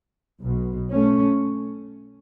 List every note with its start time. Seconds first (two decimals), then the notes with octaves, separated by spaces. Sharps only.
0.41 B1 B2
0.92 A3 C#4